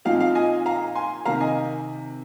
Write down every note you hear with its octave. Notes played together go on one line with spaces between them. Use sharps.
A#2 F3 C4 D#4 F5
F5
D#5 G#5
F5 A#5
G#5 C6
C3 D#3 A#3 F5 A#5
D#5 G#5